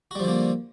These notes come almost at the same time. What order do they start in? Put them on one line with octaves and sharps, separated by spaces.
F#4 G3 F3 D3 A#3